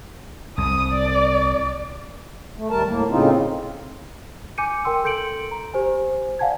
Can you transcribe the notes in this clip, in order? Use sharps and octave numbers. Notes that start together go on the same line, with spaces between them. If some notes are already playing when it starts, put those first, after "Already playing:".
C2 D#6
D5
A3
D#2 G3 A#4 A5
A2 A#3
A2 C#3 C4 D#4 F4
G#5 D6 G6 C#7 D#7
A#4 G5 C6 E6
A4 C6 G6 C#7 D7 F#7
A#5
G4 C5 G#5
D5 F5 F#5 G#5 A5 G#6